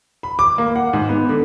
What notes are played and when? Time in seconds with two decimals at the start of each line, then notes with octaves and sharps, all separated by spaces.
0.23 B5
0.39 D6
0.58 A#3
0.76 F#5
0.93 G#2
1.09 B3
1.29 D3